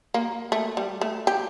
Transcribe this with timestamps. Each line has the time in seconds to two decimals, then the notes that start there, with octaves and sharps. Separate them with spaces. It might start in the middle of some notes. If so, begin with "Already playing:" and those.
0.14 A#3
0.52 A3
0.77 G3
1.01 A3
1.27 G4